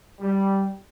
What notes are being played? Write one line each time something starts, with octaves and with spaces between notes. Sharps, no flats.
G3